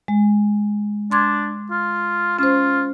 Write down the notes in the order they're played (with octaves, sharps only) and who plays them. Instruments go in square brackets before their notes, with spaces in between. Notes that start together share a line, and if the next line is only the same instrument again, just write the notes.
[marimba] G#3
[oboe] D4 [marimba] C6 D6 G#6
[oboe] F4
[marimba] C#4 C5 [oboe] F4